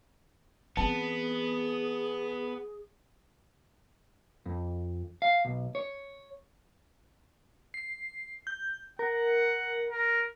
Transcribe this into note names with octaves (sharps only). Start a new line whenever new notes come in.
E3 B3 C4 G#4 A5
F2
F5
B1
C#5
C7
G6
A#4 F#5
A#4